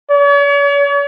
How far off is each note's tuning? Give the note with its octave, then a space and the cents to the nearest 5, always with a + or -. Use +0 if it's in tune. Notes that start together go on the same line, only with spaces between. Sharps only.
C#5 +40